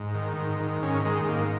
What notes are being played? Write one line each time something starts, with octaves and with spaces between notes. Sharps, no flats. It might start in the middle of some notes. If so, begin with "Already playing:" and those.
Already playing: G#2
D#3
G#2
D#3
G#2 C#4
D#3 G#3
G#2 A#3